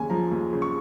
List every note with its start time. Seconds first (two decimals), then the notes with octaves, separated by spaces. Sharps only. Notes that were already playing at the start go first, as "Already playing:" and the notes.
Already playing: D#2 C#3 G#5
0.10 F3 A#5
0.31 D#2
0.53 C#3
0.62 C#6